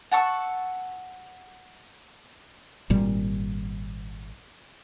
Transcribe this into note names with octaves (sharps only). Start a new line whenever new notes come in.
F#5 A5 C#6 E6
G#1 A#2 G3